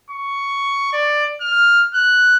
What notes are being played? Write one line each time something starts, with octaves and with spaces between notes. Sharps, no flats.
C#6
D5
F6
F#6